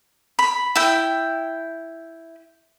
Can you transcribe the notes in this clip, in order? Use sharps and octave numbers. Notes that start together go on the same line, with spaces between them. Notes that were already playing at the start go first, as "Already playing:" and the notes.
B5
E4 G5